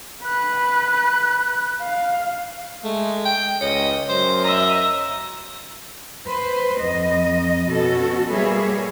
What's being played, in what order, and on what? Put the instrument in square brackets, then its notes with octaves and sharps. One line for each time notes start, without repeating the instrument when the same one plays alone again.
[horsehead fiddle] B4 [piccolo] F#6
[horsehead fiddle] F5
[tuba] G#3 [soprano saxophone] A3
[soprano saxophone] G5
[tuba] C#2 [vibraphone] C#5 [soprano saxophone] D#5
[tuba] F#2 [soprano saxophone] C5
[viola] D#5 E5 [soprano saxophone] A#5
[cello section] B4 C5
F2 D#5
B2 C#4 F#4 A4
G3 A#3 G#4 B4 C#5 E5